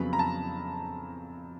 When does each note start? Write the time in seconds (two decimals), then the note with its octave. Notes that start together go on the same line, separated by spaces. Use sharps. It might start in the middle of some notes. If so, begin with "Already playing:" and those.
Already playing: F2 C#3 F#3 B3 B5
0.13 A#5
0.19 A5